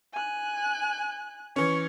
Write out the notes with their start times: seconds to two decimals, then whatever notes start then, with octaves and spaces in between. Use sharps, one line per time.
0.13 G#5 F#6
1.56 E3 C#4 C#6